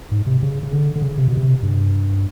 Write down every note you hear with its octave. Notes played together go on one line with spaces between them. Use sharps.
G#2
C3
C#3
C#3
D3
D3
C#3
C3
B2
C3
G2